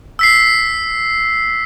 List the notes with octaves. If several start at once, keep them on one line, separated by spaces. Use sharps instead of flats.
E6 B6 C7